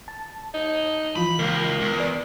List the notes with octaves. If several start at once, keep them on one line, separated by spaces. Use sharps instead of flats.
A5
D#4
E3 F3 F4 B5
C#2 A#3
E2
B4 D5